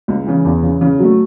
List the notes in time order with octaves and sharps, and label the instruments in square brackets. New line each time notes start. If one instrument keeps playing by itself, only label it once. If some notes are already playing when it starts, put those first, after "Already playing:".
[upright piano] C#2
C#3 E3
E2
C#3 E3
C#3
F#3 A3